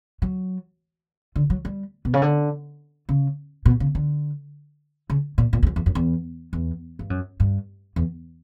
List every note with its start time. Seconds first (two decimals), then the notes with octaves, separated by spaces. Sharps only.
0.22 F#3
1.36 D3
1.50 F#3
1.65 G3
2.05 B2
2.14 C#3
2.22 D3
3.09 C#3
3.65 B2
3.80 C#3
3.95 D3
5.10 C#3
5.38 A#2
5.53 A#2
5.63 E2
5.67 F#2
5.76 E2
5.86 F#2
5.95 E2
6.53 E2
6.99 G2
7.10 F#2
7.40 G2
7.96 E2